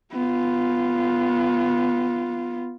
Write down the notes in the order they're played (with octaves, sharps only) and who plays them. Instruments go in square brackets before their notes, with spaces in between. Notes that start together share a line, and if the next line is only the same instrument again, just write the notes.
[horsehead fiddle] B3 F4